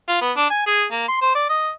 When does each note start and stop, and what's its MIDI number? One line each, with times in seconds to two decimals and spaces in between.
0.08 0.18 65
0.21 0.32 59
0.37 0.46 62
0.50 0.66 80
0.66 0.84 68
0.92 1.07 58
1.09 1.21 84
1.22 1.31 72
1.35 1.48 74
1.50 1.71 75